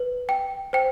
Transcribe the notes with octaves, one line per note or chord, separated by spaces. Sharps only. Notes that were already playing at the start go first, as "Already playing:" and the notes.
Already playing: B4
G5
C5 G5